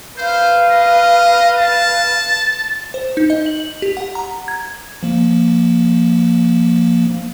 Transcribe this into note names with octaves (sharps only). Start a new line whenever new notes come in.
B4 C5 F5
D#5
A5
C5
D#4
D#5
F#7
F#7
G4
F#5
A#5
G#6
F3 A#3